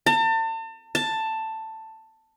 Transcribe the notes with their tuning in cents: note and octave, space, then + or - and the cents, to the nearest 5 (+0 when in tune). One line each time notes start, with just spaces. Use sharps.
A5 +40
A5 +10